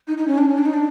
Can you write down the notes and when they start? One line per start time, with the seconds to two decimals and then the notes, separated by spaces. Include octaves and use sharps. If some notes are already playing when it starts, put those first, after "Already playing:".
0.08 D#4
0.18 D#4
0.27 C#4
0.38 D4
0.48 C#4
0.58 D4
0.66 D#4
0.74 D4